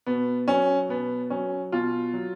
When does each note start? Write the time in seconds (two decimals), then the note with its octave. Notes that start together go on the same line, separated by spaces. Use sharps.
0.06 B2 B3
0.48 F#3 C#4
0.89 B2 B3
1.30 F#3 C#4
1.72 B2 F4
2.14 F#3